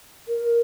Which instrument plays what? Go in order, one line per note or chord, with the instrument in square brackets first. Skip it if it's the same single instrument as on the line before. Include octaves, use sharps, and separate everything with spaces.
[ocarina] A#4